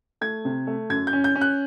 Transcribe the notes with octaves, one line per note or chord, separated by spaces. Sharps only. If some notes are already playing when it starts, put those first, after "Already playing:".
A3 G#6
C3
A3
F#2 G#6
G6
C#4
G6
C#4
F#6